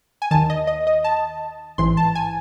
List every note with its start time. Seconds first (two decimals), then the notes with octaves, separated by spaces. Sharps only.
0.22 G#5
0.31 D#3 A5
0.34 D#2
0.50 D#5
0.67 D#5
0.87 D#5
1.04 A5
1.78 A1 G#2 E3 C6
1.97 A5
2.15 G#5